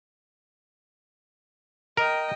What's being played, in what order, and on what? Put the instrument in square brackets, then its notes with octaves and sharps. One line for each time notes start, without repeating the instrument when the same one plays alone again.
[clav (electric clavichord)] A#4 [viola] D#5 G5